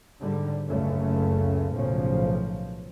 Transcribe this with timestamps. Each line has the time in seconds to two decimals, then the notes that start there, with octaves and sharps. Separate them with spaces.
0.21 G#2 D3 G3
0.67 F#1 C#2 F#2 C#3 A3 C#4
1.72 B1 A2 C#3 F3 C#4